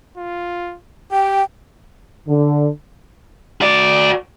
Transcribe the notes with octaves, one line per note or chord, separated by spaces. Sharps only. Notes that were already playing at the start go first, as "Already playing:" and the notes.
F4
G4 G5
D3
F#4 D5